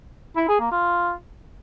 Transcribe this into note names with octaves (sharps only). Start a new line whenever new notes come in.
E4
G#4
A#3
F4